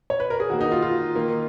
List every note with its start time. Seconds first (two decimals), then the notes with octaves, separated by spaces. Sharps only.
0.10 C#5
0.20 B4
0.30 A#4
0.40 G#4
0.50 D#3 A#3 F#4
0.61 D#4
0.72 F4
0.82 F4
1.16 D#3 A#3